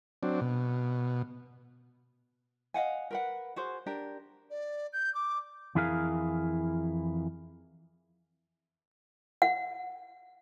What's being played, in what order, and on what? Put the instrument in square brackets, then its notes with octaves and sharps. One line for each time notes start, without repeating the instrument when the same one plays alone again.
[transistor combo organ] F#3 C4 D4
B2
[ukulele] D#5 F5 F#5 G#5
A#4 B4 F#5
F#4 G#4 C5
D4 G4 A#4
[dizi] D5
G6
D6
[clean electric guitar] F2 E3 E4 G#4 A#4 F5
[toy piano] F#5